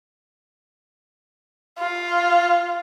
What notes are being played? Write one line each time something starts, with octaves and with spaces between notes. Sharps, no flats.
F4